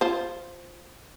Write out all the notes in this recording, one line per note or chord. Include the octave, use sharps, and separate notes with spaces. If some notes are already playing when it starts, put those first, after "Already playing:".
F4 C5